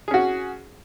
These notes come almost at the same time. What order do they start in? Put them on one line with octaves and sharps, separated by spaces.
G#4 C#4 F#4